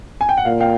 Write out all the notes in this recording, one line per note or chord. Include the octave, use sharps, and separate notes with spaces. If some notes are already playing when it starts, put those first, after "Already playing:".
G#5
G5
F#5
A#2 F5
F5 G5